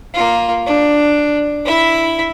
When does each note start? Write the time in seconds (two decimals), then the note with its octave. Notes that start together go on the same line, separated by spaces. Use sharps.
0.14 A#3 F4
0.67 D4
1.65 E4 E5